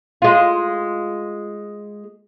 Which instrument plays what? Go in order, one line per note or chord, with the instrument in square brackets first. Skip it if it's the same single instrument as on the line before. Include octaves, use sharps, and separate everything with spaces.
[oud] G#3 F4